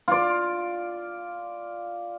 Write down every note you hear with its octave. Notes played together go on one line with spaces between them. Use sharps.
F4 D5